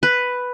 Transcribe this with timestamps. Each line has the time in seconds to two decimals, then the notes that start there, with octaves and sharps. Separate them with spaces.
0.03 B4